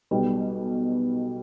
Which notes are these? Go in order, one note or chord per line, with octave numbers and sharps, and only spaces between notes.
B1 B2 G3 B3